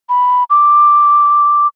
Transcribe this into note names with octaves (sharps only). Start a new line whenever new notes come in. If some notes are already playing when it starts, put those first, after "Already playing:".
B5
D6